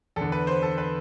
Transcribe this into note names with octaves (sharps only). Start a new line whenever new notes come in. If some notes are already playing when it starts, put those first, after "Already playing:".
E2 D3 A4
B4
C5
A4
B4